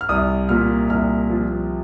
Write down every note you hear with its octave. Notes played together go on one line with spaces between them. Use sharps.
F6
C2 D#6
A#2 F6
C2 F6
F3